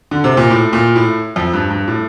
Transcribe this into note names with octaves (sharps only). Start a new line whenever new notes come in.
D3
C3
A#2
A2
A#2
A2
F2
G2
G2
A2